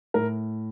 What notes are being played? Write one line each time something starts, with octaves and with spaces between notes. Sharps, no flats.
A2 A#4